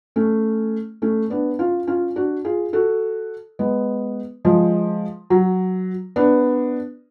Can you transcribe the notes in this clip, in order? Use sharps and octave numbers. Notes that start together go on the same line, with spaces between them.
A3 C#4
A3 C#4
B3 D4
C#4 F4
C#4 F4
D4 F#4
F4 G#4
F#4 A4
G#3 B3
F3 G#3
F#3
B3 D4